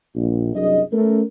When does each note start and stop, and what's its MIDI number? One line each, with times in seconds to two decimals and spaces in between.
0.15 0.52 34
0.55 0.81 36
0.55 0.81 42
0.55 0.81 54
0.55 0.81 62
0.55 0.81 68
0.55 0.81 75
0.92 1.22 57
0.92 1.22 59
0.92 1.22 61
0.92 1.22 70